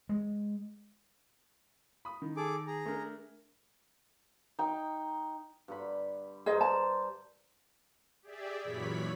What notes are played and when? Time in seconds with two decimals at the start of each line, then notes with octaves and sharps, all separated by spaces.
0.09 G#3
2.05 B5 D#6
2.22 D#3
2.37 G#4 A4 D6
2.67 G#4 A#5
2.86 A3 D4 A#4
4.59 D#4 G5
5.68 G2 D3 B5
6.46 G2 G#4 A#4 C5 D#5
6.61 A5
8.22 G4 G#4 D5 E5
8.62 F#2 A#2 E3 C#5 B5 B6